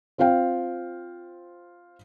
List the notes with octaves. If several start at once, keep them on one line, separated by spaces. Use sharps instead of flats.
C4 F4 C5 F5 G5